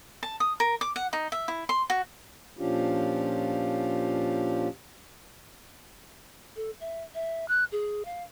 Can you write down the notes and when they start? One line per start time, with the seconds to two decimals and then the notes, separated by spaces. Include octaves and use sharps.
0.23 A5
0.40 D#6
0.60 A#4
0.81 D6
0.96 F#5
1.13 D#4
1.32 E5
1.48 E4
1.69 C6
1.90 F#4
2.59 A#2 F3 C#4 D4 F4 G4
6.56 A4
6.80 E5
7.15 E5
7.48 F#6
7.72 G#4
8.05 F5